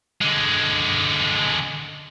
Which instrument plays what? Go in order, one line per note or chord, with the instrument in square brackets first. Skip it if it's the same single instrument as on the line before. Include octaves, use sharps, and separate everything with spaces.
[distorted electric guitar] D3 G#3